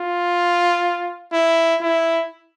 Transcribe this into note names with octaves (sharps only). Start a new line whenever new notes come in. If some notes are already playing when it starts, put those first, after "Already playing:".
Already playing: F4
E4
E4